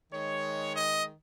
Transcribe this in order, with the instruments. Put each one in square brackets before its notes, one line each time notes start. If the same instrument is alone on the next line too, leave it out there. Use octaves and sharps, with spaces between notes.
[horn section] D#3 G#3 C#5
D#5